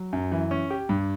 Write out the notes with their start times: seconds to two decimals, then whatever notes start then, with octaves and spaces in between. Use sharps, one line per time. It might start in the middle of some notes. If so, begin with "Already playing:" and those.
Already playing: F#3
0.13 F#2
0.32 E3
0.51 C#4
0.70 G4
0.89 G2